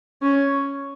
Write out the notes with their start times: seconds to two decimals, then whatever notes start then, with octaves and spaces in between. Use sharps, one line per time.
0.22 C#4